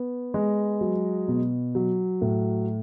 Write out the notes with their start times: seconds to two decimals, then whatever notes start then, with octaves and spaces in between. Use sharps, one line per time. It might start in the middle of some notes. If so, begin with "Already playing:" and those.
Already playing: B3
0.34 G#3
0.81 F#3
1.28 B2
1.75 F#3
2.22 A2